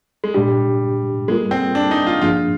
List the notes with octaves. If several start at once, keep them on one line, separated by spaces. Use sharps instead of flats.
G#3
A#2 G3 G#3 D4 G4
G3 G#3 A#3 F4 A#4
C4
D4
D#4
F4
G2 F3 A#3 D4 F4 G#4